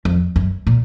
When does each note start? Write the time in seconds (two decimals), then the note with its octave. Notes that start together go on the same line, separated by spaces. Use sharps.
0.05 F2
0.36 F#2
0.67 A#2